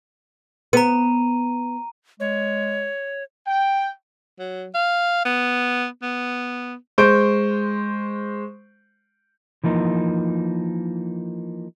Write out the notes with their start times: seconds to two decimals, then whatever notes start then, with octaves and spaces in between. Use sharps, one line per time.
0.73 B3 A#5 D#7
2.20 G#3 C#5
3.47 G5
4.39 F#3
4.74 F5
5.25 B3
6.02 B3
6.98 G#3 C5 C#6 G6 D7
9.64 E3 F3 A#3 D#4